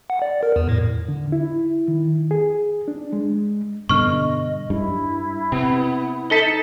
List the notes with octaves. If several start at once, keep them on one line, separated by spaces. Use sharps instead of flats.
F#5
D5
A#4
E2
A2
D3
E4
D#3
G#4
D4
G#3
G2 B2 D3 D#5 C#6 F6
G2 E4
C3 B3
D#4 A4 B6 G7